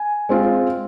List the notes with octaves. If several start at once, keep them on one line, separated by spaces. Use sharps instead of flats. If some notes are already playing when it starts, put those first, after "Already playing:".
Already playing: G#5
G#3 C4 F4